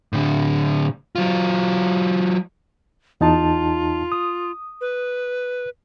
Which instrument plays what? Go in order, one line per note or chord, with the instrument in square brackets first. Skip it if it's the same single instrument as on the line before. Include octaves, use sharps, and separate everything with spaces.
[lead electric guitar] A2 D3
F#3 F4
[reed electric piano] E2 D#4 A5 [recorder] F4
[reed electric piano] D#6
[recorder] B4